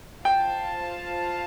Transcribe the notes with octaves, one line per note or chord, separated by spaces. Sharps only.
F4 C5 F5 G5 A5